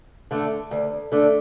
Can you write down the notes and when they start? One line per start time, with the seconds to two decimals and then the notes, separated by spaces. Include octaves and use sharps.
0.31 D3 A3 D4
0.71 D2
1.12 D3 A3 D4